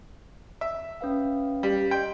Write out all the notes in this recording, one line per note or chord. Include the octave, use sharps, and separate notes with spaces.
E5
C#4 B4 F5
G3
D#5 G5 C6